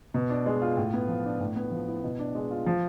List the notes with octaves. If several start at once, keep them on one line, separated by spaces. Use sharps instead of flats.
B2
D4
G#3
F4
A2
B3
F3
D4
A2
B3
F3
E4
B2
D4
G#3
F4
F3